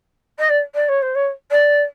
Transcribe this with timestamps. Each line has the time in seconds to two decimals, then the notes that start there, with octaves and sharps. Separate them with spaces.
0.39 D#5
0.49 D5
0.75 D5
0.88 C#5
1.02 C5
1.15 C#5
1.51 D5